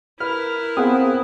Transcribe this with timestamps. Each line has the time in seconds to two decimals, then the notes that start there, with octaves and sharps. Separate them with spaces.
0.20 E4 A#4 B4 F6
0.77 B3 C4 G#4 F5 F#5 D#6